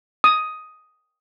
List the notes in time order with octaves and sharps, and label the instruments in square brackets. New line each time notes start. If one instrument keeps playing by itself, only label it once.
[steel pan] D#6